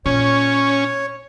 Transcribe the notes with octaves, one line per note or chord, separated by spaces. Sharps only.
A#2 C#4 C#5